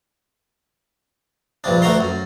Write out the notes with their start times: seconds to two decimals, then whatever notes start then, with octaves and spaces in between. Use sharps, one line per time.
1.64 A#1 G2 C3 D4
1.82 D2 A3 F#4 A#5 C6
2.01 F#2